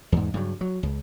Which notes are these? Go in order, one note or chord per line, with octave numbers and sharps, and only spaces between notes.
E2 G#2
G2 C#3 F#3
F#3
C#2